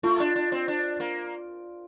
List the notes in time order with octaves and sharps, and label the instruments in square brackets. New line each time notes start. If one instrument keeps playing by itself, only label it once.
[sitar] A3 [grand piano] F4
[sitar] D4
D4
C4
D4
A#3